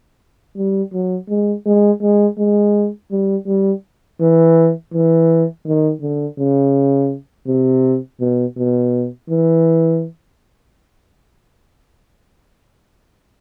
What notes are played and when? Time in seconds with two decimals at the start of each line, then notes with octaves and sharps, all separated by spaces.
0.57 G3
0.93 F#3
1.29 G#3
1.66 G#3
2.01 G#3
2.38 G#3
3.11 G3
3.47 G3
4.20 E3
4.93 E3
5.66 D#3
6.02 D3
6.39 C#3
7.47 C3
8.20 B2
8.57 B2
9.30 E3